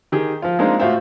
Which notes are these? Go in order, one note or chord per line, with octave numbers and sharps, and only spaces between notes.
D#3 G4 G#4
F3 F4
G#3 A#3 C4 D4 D#4 F4
A2 F4 F#4 C5 E5 F5